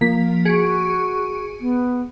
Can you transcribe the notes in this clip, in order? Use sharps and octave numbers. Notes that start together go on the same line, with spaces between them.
F3 A#3 B6
F#4 G#4 C#7 D7
B3